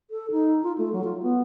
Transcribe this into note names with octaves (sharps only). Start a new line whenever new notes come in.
A4
D#4
F4
A3
F#3
F4
B3